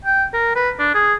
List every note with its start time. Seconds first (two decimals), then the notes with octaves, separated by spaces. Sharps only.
0.05 G5
0.34 A#4
0.55 B4
0.79 D4
0.95 G#4